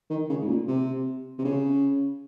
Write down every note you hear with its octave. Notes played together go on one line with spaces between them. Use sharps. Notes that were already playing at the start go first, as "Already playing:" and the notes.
D#3
C#3
G#2
A#2
C3
C3
C#3